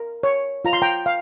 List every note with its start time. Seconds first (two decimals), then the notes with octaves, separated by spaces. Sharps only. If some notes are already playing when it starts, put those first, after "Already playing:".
Already playing: A#4
0.23 C#5
0.65 F4 A#5
0.73 C6
0.82 G5 A#5
1.06 F5